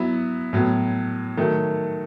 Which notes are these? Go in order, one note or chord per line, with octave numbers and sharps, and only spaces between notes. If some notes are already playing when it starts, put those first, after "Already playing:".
Already playing: F#3 B3 E4
A2 F#3 B3
D#3 F#3 A3